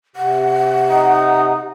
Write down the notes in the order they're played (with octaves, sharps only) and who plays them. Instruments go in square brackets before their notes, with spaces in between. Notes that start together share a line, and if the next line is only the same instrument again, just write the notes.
[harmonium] C3 [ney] F#5
[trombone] D#4